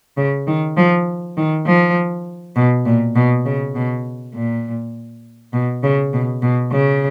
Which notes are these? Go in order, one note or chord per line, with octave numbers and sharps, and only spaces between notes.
C#3
D#3
F3
D#3
F3
B2
A#2
B2
C#3
B2
A#2
B2
C#3
B2
B2
C#3